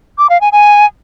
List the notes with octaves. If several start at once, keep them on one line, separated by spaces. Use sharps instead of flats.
D6
F5
G#5
G#5